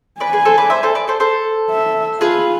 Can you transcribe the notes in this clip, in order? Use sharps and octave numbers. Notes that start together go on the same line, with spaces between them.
B4 D5 G#5
G#4 B4
A4 C5
B4 D5
C5 E5
A4 C5
B4 D5
A4 C5
A4 C5
E5
F4 G#4 B4